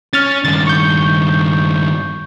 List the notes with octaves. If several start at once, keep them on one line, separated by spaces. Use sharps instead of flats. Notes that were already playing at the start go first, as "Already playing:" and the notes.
C#4 F6 A6
G2 D#3 A6
C#6 G6